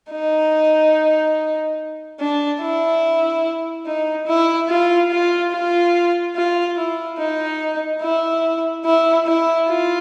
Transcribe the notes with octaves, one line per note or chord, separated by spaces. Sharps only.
D#4
D4
E4
D#4
E4
F4
F4
F4
F4
E4
D#4
E4
E4
E4
F4